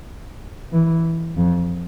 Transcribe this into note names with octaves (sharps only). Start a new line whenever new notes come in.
E3
F2